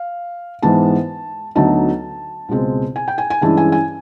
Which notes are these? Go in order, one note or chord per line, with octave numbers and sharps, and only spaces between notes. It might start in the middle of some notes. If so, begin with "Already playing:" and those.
Already playing: F5
G#2 E3 G#3 B3 A5
D2 D3 F#3 B3 D#4 A5
C#2 B2 G#3 C4
G#5
G5
G#5
G#5
G2 E3 G#3 C#4 E4 A5
G#5
G#5